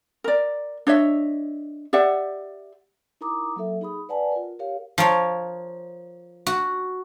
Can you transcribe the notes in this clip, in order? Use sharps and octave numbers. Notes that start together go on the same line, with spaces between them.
A#4 D5
D4 C#5 D#5 E5
G4 D5 E5 F#5
D#4 E4 A#4 A#5 D6 D#6
F#3 A#3 A4 E5
D#4 G#4 B5 D#6
B4 D5 F#5 G#5 A5
F4 A#4
G4 A#4 C#5 F5
F3 A#4 C#5
F#4